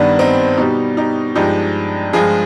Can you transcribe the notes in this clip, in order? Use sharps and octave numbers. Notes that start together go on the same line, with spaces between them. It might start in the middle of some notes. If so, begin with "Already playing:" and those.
Already playing: G2 D#3 G3 B3 D4
C4 D#4
B2 G3 D#4 G4
D#4 G4
G2 F3 G#3 D#4 G4
G2 F3 G#3 F4 G#4